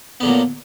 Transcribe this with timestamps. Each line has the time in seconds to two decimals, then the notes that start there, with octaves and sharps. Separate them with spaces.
0.20 B3
0.23 D3
0.25 F#3
0.28 A#2